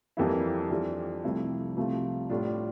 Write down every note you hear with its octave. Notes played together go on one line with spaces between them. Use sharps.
F2 E3 G3 A#3 E4
F2 E3 G3 D4 F4
C2 C3 F3 A3 E4
C2 C3 F3 A3
A2 G3 D4 F4